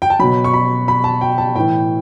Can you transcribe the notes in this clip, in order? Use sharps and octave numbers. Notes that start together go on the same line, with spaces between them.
G5
A5
B2 F#3 B5
C#6
B5
B5
A5
G5
A5
A2 E3 G5